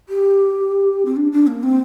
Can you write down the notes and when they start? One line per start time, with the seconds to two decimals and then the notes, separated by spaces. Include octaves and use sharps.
0.09 G4
1.05 C4
1.16 D4
1.32 D4
1.47 A#3
1.63 C4